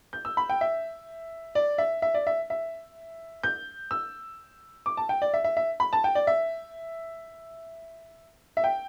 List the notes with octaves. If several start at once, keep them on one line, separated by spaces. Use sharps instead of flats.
G6
E6
B5
G5
E5
D5
E5
E5
D5
E5
E5
G6
E6
D6
A5
G5
D5
E5
E5
E5
B5
A5
G5
D5
E5
E5
G5